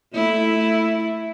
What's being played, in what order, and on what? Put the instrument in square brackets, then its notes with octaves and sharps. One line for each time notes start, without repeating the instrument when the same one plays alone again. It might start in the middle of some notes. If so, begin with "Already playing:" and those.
[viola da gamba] A3 E4